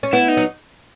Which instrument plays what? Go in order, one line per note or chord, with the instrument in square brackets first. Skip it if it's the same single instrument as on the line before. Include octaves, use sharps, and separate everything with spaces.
[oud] C#4
[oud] B3 [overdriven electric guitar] E4
[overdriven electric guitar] D#4
[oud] F#3